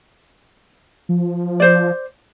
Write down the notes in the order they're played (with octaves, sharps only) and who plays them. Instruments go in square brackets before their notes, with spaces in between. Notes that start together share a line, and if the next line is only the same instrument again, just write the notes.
[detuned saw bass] F3
[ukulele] C5 D5